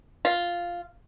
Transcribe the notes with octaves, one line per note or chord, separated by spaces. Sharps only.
F4